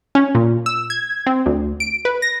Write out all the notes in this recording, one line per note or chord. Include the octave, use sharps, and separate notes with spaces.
C#4
A#2
E6
G#6
C4
D2
D7
B4
A#6